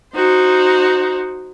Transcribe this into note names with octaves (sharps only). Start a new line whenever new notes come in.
D#4 F#4 C5